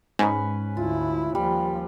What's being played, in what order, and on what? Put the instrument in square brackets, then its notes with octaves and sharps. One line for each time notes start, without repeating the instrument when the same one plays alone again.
[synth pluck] G#2 [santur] C#4 B4
[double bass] D2 E4 [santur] F4
[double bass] D#2 F3 [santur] G3